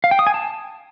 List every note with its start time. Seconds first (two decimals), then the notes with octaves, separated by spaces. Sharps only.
0.04 F5
0.11 G5
0.19 D#6
0.27 G#5
0.34 A5